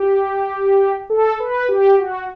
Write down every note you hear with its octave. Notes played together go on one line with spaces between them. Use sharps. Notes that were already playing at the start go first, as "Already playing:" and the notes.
Already playing: G4
A4
B4
G4
F#4